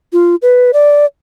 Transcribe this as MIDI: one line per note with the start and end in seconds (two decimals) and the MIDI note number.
0.13 0.35 65
0.42 0.71 71
0.73 1.05 74